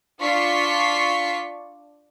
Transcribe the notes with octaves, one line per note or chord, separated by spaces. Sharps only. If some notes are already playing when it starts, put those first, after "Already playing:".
D4 F4 C#6 B6 C7